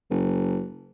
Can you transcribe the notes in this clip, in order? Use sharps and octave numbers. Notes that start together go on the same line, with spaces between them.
F#1